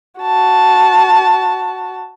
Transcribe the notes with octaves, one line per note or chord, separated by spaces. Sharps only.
F#4 A5